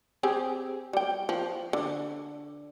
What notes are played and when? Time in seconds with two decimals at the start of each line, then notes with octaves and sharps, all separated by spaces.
0.23 C4 G4 G#4
0.93 G3 G5
1.29 F3
1.73 D3